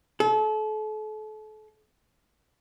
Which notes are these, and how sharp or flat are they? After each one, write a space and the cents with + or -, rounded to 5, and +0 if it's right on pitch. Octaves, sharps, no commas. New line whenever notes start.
A4 -35